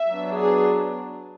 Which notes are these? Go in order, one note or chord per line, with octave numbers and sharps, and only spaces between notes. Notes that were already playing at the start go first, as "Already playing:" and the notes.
Already playing: E5
F#3 B3 D4
G#4